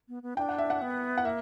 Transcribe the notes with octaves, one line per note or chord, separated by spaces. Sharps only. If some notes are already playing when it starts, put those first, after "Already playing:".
B3
B3
D4 G5
F#5
E5
F#5
B3
F#5
A#3 E5